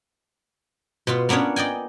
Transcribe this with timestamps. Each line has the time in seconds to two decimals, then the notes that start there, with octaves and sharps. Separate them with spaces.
1.07 B2 B3 F4
1.29 A#3 B3 C#4 D4 C#5
1.56 D5 D#5 G5 G#5